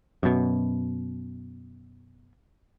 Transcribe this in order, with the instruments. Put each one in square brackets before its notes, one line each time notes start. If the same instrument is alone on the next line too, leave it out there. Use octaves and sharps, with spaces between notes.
[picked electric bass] F#2 B2